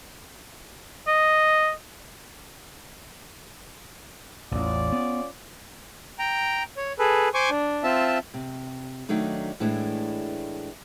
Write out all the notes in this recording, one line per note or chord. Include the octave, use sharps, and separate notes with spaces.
D#5
A1 E2 C#4 F4 D5
B3
G5 A#5
C#5
G#4 A4 B4
C5 G#5 C#6 D6
D4
C4 F4 E5 A5
C3
D#3 F#3 A3 D4 D#4
A2 E3 G#3 A3 D4